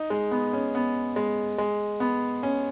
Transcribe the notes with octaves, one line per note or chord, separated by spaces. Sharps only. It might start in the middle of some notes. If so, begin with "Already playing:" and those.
Already playing: D#4
G#3
B3
C#4
B3
G#3
G#3
B3
C#4